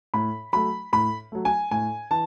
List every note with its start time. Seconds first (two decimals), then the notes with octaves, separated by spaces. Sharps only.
0.14 A2 B5
0.53 F#3 A3 B5
0.93 A2 B5
1.32 F#3 A3
1.45 G#5
1.71 A2 G#5
2.11 E3 A5